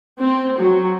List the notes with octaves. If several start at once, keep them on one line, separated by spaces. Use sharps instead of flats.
C4
F#3